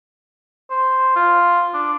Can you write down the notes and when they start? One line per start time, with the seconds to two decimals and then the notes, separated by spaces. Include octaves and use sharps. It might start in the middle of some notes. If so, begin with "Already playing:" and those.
0.71 C5
1.16 F4
1.74 D4